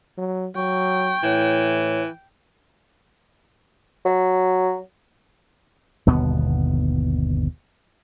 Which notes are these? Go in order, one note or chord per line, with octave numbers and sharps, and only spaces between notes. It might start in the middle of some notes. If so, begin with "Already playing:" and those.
F#3
F#3 G5 C#6
A2 E3 C#5
F#3
G1 D#2 B2 B3